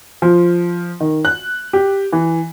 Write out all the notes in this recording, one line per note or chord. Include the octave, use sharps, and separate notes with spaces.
F3
D#3
F#6
G4
E3